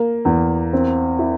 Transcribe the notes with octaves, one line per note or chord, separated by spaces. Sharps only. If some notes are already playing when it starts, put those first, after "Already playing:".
Already playing: A#3
E2
C4
E4